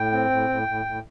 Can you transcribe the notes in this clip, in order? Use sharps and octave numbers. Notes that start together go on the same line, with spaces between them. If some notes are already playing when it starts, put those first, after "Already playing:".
Already playing: A2 G5
C4
A2
A2
A2
A2